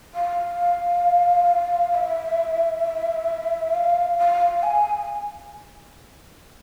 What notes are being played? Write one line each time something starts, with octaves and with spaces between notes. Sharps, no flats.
F5
E5
F5
F5
G#5